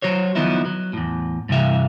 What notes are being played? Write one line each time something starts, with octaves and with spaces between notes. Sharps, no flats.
F#3 F#4 C5 C#5
D#3 F3 F#3 B3 D#4 E4
F#3
E2 A2
G2 C3 E3 E5 F5